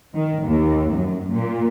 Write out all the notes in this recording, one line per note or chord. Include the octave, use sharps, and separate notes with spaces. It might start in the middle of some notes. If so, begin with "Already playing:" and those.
D#3
D#2
F#2
A#2